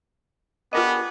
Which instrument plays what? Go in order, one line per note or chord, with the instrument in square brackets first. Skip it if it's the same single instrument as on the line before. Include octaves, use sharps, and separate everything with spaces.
[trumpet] B3 [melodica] D4 G4 G#4 [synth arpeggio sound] F4 A#4 D#5